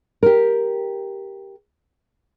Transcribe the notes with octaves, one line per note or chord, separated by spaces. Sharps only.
G4 A#4